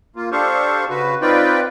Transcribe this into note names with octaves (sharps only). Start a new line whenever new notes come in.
A#3 F4
D4 G4 A4 C5 F5 C#6
C#3 F#4 B4
C4 D#4 F4 B4 D5 G5